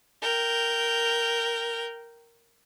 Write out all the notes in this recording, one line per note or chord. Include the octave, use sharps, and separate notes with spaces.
A#4 G5